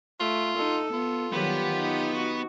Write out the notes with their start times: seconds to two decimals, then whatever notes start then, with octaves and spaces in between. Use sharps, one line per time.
0.20 A3 F4
0.57 D#4 A4
0.93 B3 F4
1.33 D#3 F#3 G3 B3 G4
1.74 D#4
2.15 F#4